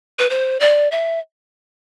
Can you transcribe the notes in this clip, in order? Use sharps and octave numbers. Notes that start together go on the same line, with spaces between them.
B4
C5
D5
E5